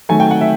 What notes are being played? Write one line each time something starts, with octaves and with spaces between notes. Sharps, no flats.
D#3 F#3 A3 G#5
G5
F#5
E5